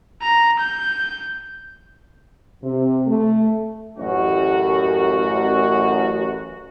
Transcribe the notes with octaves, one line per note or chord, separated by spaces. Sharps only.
A#5
G6
C3
A3
A1 F#2 F#4